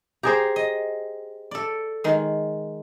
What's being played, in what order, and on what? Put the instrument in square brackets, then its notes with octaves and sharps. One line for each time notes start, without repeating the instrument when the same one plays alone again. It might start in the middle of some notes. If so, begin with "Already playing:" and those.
[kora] G4 G#4 C5 [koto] A#5
[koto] D#5
A4 D5
D#3 G#3